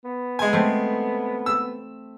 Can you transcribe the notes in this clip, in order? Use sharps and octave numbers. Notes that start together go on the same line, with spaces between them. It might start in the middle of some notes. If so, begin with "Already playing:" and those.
B3
G#3 G#5
A3 C4
E6